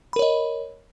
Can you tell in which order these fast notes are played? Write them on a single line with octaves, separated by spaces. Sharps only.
B5 A#4 C#5 D#5